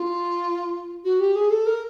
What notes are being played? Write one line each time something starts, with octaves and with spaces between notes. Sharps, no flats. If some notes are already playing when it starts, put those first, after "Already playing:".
Already playing: F4
F#4
G4
G#4
A4
A#4